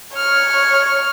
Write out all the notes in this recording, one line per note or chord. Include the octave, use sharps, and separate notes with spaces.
C#5 F6